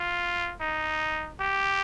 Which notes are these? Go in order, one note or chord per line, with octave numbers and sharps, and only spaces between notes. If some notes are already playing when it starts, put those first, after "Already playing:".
Already playing: F4
D#4
G4